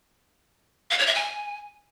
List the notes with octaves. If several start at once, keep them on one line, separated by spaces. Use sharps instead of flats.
F5
C#5
E5
G#5